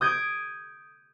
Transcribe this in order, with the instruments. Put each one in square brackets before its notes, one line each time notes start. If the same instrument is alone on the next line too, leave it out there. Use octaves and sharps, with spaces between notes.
[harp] D#6 G6 G#6 D7 D#7